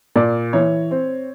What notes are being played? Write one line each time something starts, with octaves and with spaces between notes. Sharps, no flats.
A#2 D5
E3 C#5
C4